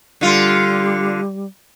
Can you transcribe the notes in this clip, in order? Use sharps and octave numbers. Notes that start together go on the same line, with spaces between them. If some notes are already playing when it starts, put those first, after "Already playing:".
D3 G3 F4